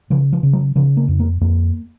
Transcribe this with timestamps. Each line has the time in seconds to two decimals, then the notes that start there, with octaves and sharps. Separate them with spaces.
0.10 C#3 F3
0.33 F3
0.43 C#3
0.53 F#3
0.76 C#3 F3
0.97 A#3
1.08 F2
1.20 A#3
1.41 F2 A#3